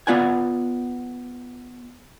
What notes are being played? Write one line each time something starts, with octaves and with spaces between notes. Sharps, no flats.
B3 F4 D5 F#5 G#5